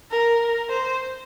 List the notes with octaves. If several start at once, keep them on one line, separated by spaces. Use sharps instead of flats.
A#4
C5